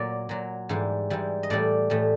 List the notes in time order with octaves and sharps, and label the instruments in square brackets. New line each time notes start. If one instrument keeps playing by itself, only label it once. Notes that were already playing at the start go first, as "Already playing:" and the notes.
Already playing: [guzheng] A#2 F#3 D5
A#2 F#3
G#2 E3 G3
G#2 E3 G3
D#5
A2 E3 G3 D5
A2 E3 G3